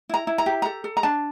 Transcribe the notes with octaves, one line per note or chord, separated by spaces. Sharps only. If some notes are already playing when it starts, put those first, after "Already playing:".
E4 A#5
E4
A#5
G4
A4 A#5
A4
A#5
D4 A5